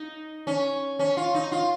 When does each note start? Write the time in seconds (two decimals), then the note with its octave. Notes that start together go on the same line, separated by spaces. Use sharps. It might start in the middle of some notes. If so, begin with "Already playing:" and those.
Already playing: D#4
0.47 C#4
0.99 C#4
1.17 F4
1.34 D#4
1.52 F4